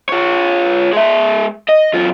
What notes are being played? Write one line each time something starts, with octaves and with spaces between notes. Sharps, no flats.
F4 C#5
G#3 E5
D#5
F#2 F4